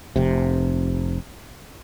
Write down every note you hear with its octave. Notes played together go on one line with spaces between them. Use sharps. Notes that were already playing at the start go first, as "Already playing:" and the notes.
F1 C3